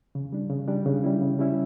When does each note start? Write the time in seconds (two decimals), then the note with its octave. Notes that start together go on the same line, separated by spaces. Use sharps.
0.15 C#3
0.33 G3 D4
0.50 C#3
0.68 G3 D4
0.86 C#3
1.04 G3 C#4 E4
1.21 C#3
1.39 G3 C#4 E4